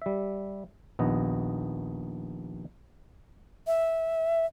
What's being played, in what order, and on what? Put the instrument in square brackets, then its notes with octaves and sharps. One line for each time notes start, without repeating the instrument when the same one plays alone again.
[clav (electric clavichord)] G3 E5
A#1 D#2 B3 D#5
[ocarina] E5